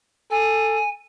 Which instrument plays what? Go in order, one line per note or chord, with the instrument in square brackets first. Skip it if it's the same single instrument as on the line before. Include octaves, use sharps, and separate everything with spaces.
[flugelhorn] A4 [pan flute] G#5